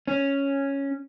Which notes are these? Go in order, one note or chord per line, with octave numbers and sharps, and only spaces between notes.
C#4